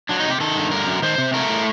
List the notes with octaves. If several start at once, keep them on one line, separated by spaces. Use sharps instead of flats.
F#3 D4
D#4
C3 G4
D#3 A4
G2
D3 A#4
F#2
D#3 C5
C3
A3 A#4
A2